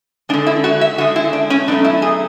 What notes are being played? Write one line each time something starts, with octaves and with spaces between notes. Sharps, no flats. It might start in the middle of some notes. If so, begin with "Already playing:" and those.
D3 G#3 D4
E4
F#4
E5
D3 G#3 F#4
E4
D4
C#4
B2 F#3 A3 D4
E4
G#4